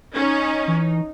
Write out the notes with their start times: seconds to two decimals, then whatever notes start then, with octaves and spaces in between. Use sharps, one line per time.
0.15 C#4 D#4
0.67 E3